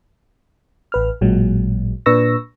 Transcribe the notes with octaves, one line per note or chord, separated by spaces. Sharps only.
A1 B4 F6
A1 A#2 F#3 G#3
A#2 D4 B4 C#6 E6 A#6